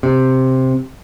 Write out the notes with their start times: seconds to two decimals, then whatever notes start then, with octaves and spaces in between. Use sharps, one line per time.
0.03 C3